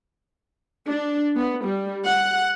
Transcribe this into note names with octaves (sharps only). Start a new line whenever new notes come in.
D4
B3
G3
F#5